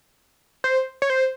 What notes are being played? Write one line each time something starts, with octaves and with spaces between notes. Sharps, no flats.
C5
C#5
C5